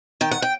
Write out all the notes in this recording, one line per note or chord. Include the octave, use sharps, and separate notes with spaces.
D#3 G5
F#5
G5